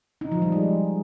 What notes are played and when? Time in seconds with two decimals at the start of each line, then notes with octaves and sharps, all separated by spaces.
0.21 D#4
0.32 F3
0.42 G3
0.52 G#3